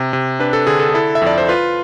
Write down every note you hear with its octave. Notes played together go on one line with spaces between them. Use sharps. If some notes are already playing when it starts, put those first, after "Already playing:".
Already playing: C3
C3
D4 B4
A4
D3 G#4
A4
G#4
E4 A4
E5
F2
D5
C5
F4 B4